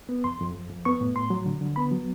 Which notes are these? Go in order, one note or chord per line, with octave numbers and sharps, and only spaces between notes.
B3
F2 C6
F2
F2
F2
B3 C#6
A2
A2 C6
F#3
D3
D3
B3 B5
F#3